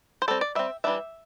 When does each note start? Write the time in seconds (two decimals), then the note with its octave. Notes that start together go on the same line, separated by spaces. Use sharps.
0.22 C5
0.28 G3 C4 A4
0.41 D5
0.55 G3 C4 E5
0.84 E3 G3 D4 E5